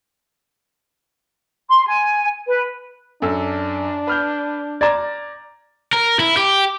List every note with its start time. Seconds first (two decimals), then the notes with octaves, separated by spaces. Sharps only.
1.68 C6
1.85 G#5
2.46 B4
3.22 F#2 D4 A4 E6
4.07 B4 F6 G6
4.81 D5 A#5 G#6 A6 E7
5.93 A#4
6.19 E4
6.37 G4